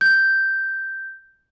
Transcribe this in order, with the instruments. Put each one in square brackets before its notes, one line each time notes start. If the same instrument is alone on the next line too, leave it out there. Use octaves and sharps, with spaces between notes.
[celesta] G6